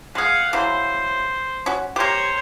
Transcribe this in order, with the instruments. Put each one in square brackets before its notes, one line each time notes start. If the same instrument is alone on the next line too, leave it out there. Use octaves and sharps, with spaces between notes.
[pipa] G#3 G#4 [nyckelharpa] F5 F#5
[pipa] C#3 E3 F#3 [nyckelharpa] C5
[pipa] C#4 F#4
[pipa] G4 A#4 [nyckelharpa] C5 C#5